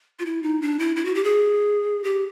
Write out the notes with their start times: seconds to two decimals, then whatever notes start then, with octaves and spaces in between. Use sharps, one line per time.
0.19 F4
0.26 E4
0.43 D#4
0.62 D4
0.79 E4
0.96 E4
1.05 F#4
1.15 G4
1.24 G#4
2.04 G4